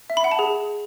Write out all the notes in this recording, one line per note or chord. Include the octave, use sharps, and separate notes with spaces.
E5
B5
F#5
A5
G#4